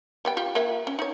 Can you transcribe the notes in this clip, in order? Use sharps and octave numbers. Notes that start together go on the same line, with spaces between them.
G3 B3 G5
F4 G4
A#3 E5
C#4
D#4 C#5